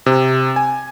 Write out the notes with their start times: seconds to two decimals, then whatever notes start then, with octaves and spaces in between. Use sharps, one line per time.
0.06 C3
0.56 G#5